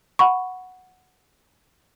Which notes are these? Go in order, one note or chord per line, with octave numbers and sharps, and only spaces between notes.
F#5 B5 C#6